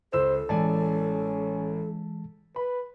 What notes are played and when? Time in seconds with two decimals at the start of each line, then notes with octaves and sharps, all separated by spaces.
0.13 C#2 A4 C5 E6 E7
0.49 A1 E3 G#3 C#4 D5 G#5 A5
2.56 B4 B5